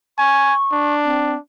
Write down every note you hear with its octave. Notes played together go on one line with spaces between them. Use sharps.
G#5 C#6
D4
C4